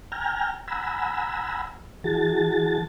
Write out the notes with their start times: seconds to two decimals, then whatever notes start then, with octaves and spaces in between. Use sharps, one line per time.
0.12 G5 G#5 A#5 F6
0.68 F#5 G#5 A#5 B5 E6
2.04 E3 F#4 G#4 A5 A6